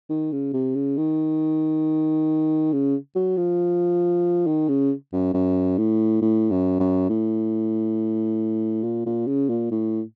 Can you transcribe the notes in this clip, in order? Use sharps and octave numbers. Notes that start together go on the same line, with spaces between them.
D#3
C#3
C3
C#3
D#3
C#3
F#3
F3
D#3
C#3
F#2
F#2
A2
A2
F#2
F#2
A2
A#2
A#2
C#3
A#2
A2